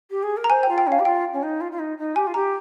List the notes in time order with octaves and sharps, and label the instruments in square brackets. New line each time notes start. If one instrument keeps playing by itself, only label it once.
[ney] G4
G#4
A#4
[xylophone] A#5
[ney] C5 [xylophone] G#5
[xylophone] G5
[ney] F4
[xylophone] G5
[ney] C#4 [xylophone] F5
[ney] G4
[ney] F4 [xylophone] G5
[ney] C#4
D#4
F4
F4
D#4
D#4
[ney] G4 [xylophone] G#5
[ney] F4
[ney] G4 [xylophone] A#5